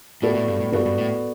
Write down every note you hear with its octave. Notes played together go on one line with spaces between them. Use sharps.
A2 B3 F#4 A4 D5
A2
G2
A2
G2 B3 F#4 A4 D5
G2
A2